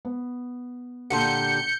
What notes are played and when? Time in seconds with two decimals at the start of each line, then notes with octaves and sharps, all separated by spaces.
0.05 B3
1.10 A#2 D3 G4 F#5 C6 G6 C#7